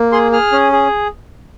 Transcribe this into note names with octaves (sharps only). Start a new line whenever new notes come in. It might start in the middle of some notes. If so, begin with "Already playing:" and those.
Already playing: A#3
G#4 C6
G#4 F6
C#4
G#4